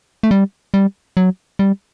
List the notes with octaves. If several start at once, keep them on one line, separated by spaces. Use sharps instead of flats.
A3
G3
G3
F#3
G3